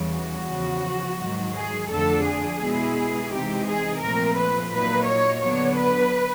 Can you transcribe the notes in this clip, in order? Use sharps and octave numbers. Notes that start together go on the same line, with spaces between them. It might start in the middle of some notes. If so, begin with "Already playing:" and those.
Already playing: E2 C#3 E3 G3
F#4
E2 C#3 F3
G#2 D#3 F#3
G#4
F2 D3 F3 A3 D4 A4
G#4
B2 G#3 B3 E4
C3 E3 G#3 C4 D#4 G4
G#4
A#2 F3 A3 C4 A#4
B4
A#2 F#3 A#3 D#4 B4
C#5
D3 F#3 B3 D4 C#5
B4